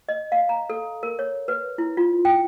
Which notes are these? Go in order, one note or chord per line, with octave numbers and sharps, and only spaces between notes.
D#5
F5
A#5
A4
A#4
C#5
B4
E4
F4
G5